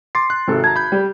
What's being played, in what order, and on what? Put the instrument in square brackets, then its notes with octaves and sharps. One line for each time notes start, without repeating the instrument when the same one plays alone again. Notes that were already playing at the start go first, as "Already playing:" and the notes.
[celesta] C6 [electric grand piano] D6 A6 C7
[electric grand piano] F#6
[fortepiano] G#1 [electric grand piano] C3 A4
[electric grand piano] A5 A#5 [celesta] G#6
[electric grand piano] B5 G6
[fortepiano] G3